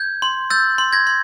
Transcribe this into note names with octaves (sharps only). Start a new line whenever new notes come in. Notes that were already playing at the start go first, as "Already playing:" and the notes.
Already playing: G6 G#6
C6
E6 G6 A6
C6
G#6 A#6
C6